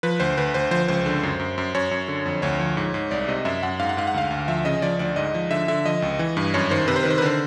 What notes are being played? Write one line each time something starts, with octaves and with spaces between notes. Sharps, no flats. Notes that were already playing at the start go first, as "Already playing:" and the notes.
F3 B4
D2 C5
D2 B4
D2 C5
F3 C5
C#2 C5
D3
F#2
F#2
F#2
F#2 C#5
F#2
D3
F2
D2 C#5
F3
G#2
G#2
C2 D5
C3 D#5
F#2 E5
F#2 F#5
G#2 F5
F#5
G#2 F5
F#5
D2 F5
D2
F3 E5
C#3 D#5
F3 D5
D2 D5
G#2 D#5
F3
D3 E5
D3 E5
F3 D#5
C#2
E3
G2
F#2 C#5
D#3 C5
C3 B4
C5
D#3 B4
C5
B4
D3 C5